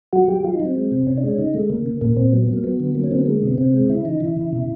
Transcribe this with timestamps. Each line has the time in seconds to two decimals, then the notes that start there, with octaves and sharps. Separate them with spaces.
0.13 F#3 F#4
0.28 F#3 G4
0.44 F#3 F4
0.55 D#4
0.60 F#3
0.65 C4
0.75 G#3
0.92 C3
1.07 C3 C#4
1.17 D4
1.23 G#3 C#4
1.38 C#3 D#4
1.54 G#3 A3
1.70 C#3 A#3
1.86 C#3
2.01 A#2 A#3
2.17 A#2 C4
2.33 F#3 B3
2.43 B3
2.48 F#3 A#3
2.64 F#3 B3
2.80 D3
2.95 F#3 A#3
3.04 C#4
3.11 D3 C4
3.19 B3
3.26 G#3 A#3
3.42 C3 B3
3.58 C3 C4
3.74 G#3
3.89 C#3 E4
4.05 E3 D#4
4.20 E3 E4
4.36 C#3
4.53 B2